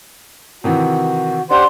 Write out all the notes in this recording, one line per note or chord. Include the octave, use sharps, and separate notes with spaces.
C3 D#3 E3 F#4
D4 G4 C5 D5 F#5 C6